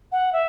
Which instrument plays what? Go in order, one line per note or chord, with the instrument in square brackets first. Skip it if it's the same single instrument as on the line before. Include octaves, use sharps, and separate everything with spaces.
[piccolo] F#5
E5